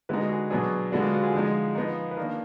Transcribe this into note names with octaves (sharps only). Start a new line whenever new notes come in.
D3 G#3 B3 D#4 B4
F#4
G#4
B2 F#3 B3 D4 G#4
D3 G#3 B3 D4 F#4
F4
F#4
G#4
D3 F3 G#3 D#4
F3 B3 D#4
B4
D#3 A#3 D4 A#4